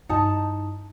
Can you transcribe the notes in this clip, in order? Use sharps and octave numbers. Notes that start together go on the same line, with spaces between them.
G2 D#4 E4 A5